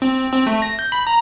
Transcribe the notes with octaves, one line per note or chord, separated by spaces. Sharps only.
C4
C4
A3
A#6
G6
B5
A#5